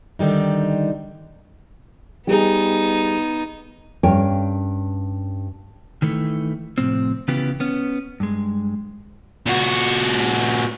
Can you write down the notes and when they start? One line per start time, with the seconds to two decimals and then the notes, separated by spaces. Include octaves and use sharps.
0.19 D3 D#3 G3 D#4
2.27 G3 B3 D#4 G#4
4.03 G2 C#4 A#4 C#5 G5
6.02 D#3 E3 A3
6.78 A2 C3 F3 C4
7.28 C#3 E3 B3 F4 G4
7.60 B3 C#4
8.20 G2 G#3
9.46 A#2 F#4